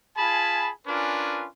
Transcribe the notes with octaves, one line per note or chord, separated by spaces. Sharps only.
F4 G#4 G#5 A5 B5
C#4 D4 F4 A#4 B4 G#5